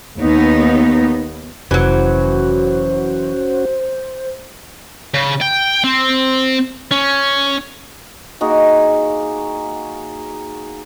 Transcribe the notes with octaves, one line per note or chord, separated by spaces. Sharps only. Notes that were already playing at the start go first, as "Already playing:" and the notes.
D#2 B3 D#4
F1 E3 F#3 C#4 F#4 C5
C#3
G5
C4
C#4
A#3 D#4 F#4 G#4